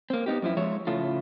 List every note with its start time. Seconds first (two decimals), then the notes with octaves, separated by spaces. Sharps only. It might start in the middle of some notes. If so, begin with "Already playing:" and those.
0.10 A#3 C4
0.26 B3 C#4 D#4 G4
0.42 F#2 F3 E4
0.57 F3 G#3 C#5 E5
0.87 A2 C#3 A3 F4